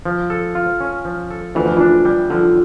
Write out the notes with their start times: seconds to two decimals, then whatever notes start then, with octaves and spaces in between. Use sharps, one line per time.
0.05 F3
0.30 A4
0.55 F4
0.80 C#4
1.05 F3
1.31 A4
1.55 D2 E3
1.66 F3
1.76 E3 D4
2.05 G3
2.30 D3 F3